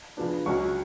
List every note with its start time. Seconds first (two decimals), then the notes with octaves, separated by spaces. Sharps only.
0.17 C#3 F3 B3 D4
0.46 C#2 C#3 F#3 C#4 C#6